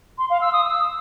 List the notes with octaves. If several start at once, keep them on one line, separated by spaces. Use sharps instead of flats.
C6
F5
E6
D#6
E6